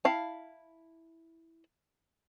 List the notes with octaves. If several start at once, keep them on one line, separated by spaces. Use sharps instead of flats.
E4 F5 A5